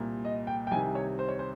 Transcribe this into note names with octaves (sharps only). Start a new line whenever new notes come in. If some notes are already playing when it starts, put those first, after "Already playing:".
Already playing: C2 A#2
D#5
G5
G5
C2 C3 D#3 G#5
C#5
C5
C#5
C5